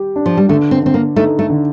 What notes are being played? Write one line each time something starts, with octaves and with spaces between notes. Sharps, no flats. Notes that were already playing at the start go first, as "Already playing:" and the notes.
Already playing: G3 G4
D4
F3
G3
D3 A3
C4
D3 C4
A#3
A3 D#4
A3
D3